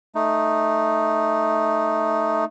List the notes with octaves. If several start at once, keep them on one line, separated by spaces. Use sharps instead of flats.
A3 D#4